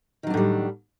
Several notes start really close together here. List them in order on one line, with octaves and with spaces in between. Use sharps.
D#3 F#3 D4 A2 G3